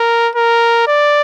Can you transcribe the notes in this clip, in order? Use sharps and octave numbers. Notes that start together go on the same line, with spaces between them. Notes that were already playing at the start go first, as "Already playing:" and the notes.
Already playing: A#4
A#4
D5